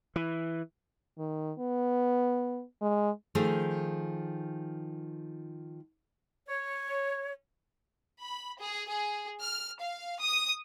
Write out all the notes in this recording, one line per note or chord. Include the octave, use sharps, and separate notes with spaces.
E3
D#3
B3
G#3
D#3 F3 A3 G#4
C#5
B5
G#4
G#4
F6
F5
D#6